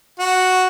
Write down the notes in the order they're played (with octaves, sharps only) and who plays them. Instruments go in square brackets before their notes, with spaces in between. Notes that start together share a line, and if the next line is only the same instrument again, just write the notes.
[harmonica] F#4